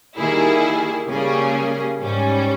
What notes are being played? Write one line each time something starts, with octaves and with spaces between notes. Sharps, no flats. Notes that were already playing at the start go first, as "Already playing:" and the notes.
D#3 G3 A#3 E4 G#4
C#3 G3 A#3 C#4 G#4
G#2 G3 C#4